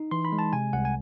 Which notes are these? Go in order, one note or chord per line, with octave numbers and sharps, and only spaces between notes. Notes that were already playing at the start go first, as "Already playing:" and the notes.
Already playing: D#4
E3 C6
B5
G#3
A5
C3 G#5
C2 F#5
G#5